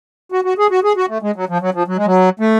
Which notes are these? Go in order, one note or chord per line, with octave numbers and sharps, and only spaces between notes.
F#4
F#4
G#4
F#4
G#4
F#4
A3
G#3
F#3
F3
F#3
F3
F#3
G#3
F#3
A3